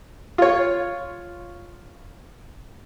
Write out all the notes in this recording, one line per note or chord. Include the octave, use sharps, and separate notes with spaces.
F4 C#5